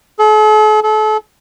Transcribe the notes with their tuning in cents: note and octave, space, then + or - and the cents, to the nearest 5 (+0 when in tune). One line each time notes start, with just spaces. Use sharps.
A4 -45
A4 -35